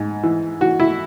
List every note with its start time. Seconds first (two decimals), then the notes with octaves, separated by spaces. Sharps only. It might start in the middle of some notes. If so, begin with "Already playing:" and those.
Already playing: G#2
0.23 E3
0.61 E3 F#4
0.80 E4